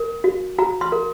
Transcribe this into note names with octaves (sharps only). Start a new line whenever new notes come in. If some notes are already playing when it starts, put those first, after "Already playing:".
Already playing: A#4
F#4
F#4 A#5
C6
A#4